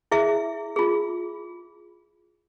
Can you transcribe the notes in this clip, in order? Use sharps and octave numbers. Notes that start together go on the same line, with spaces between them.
E4 G#4 E5
F4 G#4